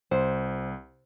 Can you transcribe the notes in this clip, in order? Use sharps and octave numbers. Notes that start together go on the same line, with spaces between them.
C2 C5